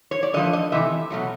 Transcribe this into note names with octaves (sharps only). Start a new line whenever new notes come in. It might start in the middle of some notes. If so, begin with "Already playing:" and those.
C#5
D5
D3 F3 A3 D#5
D#5
C3 E3 A3 E5
B2 F#3 A3